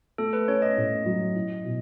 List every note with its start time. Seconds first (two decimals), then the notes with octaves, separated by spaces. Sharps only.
0.18 A3 A4
0.33 B4
0.48 C#4 C#5
0.62 D#5
0.77 A2
1.06 F#3
1.35 E4
1.64 B2